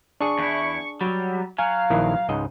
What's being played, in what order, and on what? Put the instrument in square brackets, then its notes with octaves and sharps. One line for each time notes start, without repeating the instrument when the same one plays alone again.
[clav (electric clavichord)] D4 G#4 [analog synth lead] C#6
[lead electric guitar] E2 E4
[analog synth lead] F#3 [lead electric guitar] G3
[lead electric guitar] F#3 [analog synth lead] F5 [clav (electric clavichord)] G#5
[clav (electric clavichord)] A#1 D#3 E4
C#2 G#2 D#5